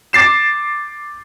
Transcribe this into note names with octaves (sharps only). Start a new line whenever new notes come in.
D6 A6 C7 E7